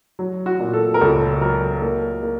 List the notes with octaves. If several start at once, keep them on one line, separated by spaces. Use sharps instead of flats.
F#3
F#4
A#2
A4
A#4
C#2 A4
F#3 A#4
A#3
A#3